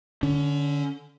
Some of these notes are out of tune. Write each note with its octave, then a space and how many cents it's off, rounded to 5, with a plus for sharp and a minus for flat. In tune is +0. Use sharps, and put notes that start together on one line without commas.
D3 +0 C#4 +30